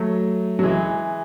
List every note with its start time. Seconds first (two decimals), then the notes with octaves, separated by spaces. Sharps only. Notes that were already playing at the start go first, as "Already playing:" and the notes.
Already playing: F#3 A3
0.59 F#3
0.63 E3 G#3